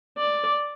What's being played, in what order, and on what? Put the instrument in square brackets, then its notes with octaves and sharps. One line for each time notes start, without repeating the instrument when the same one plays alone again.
[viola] D5